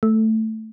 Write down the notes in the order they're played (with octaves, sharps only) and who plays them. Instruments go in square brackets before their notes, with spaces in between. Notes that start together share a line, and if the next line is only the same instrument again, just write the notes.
[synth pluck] A3